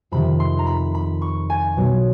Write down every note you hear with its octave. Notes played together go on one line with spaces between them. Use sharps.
F2 C3 D#3 B5
C6
A#5
B5
B5
C#6
G#5
B1 B2 F#3